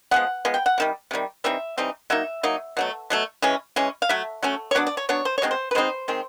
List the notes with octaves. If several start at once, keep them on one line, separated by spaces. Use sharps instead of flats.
F3 G#3 B3 F#5
F3 G#3 B3
G5
F#5
C3 D#3 G3
C3 D#3 G3
E3 G3 C4 D#4 E5
E3 G3 C4 D#4
F#3 A#3 D#4 E5
F#3 A#3 D#4
B2 F#3 A3
B2 F#3 A3
E3 G#3 C#4
E3 G#3 C#4
F5
F#3 A3 E5
F#3 A3 C#4
C#5
F#3 B3 D4 D5
D5
C#5
F#3 B3 D4 C#5
C5
C#5
B2 G#3 C4 D#4
C5
B4
B2 G#3 C4 D#4 C5
D#3 G#3 C4